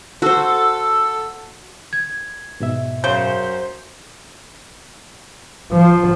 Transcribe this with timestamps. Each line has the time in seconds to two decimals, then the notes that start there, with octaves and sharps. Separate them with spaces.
0.22 F#4 A4 C5
1.93 G#6
2.60 G#2 B2 E5
3.04 F#2 C#3 C5 G6 G7
5.72 F3